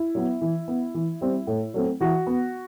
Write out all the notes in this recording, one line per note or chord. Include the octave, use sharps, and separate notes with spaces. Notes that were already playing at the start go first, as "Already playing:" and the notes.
Already playing: E4
F#3 B3
E3
B3
E3
G3 C4
A2
F#3 A3 C4
E3 F#4
B3